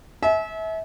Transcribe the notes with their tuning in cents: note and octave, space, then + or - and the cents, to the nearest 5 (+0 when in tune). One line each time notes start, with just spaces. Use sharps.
E5 -30 G#5 +45